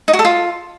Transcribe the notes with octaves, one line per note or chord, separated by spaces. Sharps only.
D#4
F#4
A4
F4